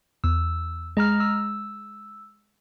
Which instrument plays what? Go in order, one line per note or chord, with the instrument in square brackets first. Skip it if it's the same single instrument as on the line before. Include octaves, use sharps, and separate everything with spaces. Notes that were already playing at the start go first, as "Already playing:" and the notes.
[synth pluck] E2 [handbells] E6
[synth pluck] G#3 [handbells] D#5 A#5 F6
[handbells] E6